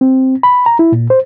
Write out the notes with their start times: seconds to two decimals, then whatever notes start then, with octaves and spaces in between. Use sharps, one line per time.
0.01 C4
0.43 B5
0.66 A#5
0.79 E4
0.92 A#2
1.10 C5